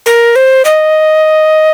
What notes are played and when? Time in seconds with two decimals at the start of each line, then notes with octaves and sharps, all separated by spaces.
0.06 A#4
0.36 C5
0.65 D#5